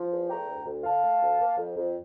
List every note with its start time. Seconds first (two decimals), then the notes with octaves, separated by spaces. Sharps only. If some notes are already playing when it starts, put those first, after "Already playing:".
Already playing: F3
0.11 E2
0.29 A3 G5 A#5
0.48 D2
0.65 D2
0.84 D3 F5 A5
1.03 A3
1.21 D2
1.40 A#3
1.57 F2
1.76 F2